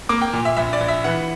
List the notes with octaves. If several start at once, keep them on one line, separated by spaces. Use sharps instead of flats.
A#3 D6
G5
A#2
E5
A#1 E5
D5
A#1
E5
E3 F#5